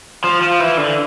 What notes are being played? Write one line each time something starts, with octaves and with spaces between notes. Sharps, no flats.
F3
F3
E3
D3